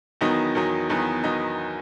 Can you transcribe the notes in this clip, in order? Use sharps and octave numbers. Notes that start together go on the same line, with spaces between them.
E2 D#3 F#3 B3 D#4
E2 D#3 F#3 B3 D#4
E2 D#3 F#3 B3 D#4
D#3 F#3 B3 D#4